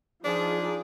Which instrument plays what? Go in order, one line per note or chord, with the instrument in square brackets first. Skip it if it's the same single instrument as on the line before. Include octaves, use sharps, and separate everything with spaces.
[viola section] F3 D#4 G#4 [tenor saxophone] D4